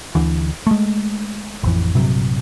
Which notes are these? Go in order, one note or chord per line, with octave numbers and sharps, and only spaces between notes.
D2 D3 E3
G#3 A3
A1 F2 E3
A#1 G2 C3 F#3